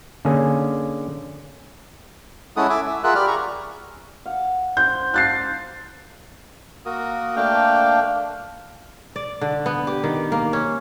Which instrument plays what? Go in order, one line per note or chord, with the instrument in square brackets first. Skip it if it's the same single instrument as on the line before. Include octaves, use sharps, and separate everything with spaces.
[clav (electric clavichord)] D3 A#3 C#4 G#4
[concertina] G#3 C#4 E4 A4 F#5 D#6
E5 G#5 D6
E5
F4 G#4 A#4 E5 F#5 F#6
G4 D5 B5 F6
G#4 A#5 C#6
[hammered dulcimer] F5 F#5
[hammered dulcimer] C5 [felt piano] G6
[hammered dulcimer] F5 A5 [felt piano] F#6 A6 C7
[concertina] A#3 F#4 A#4 D#6
A3 A#3 D4 F5 G5
[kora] D5
D3
B3
G4
D#3
A#3
C#4